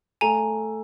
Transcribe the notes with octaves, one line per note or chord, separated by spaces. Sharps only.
A3 G#5 A#5